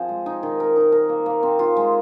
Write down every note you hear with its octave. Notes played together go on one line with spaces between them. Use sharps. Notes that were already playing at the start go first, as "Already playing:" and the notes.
Already playing: F3 C4 G#4 C5
G#3
D#4
D#3
A#4
D#4
A#4
A#3
A#3
C4
F4
G#3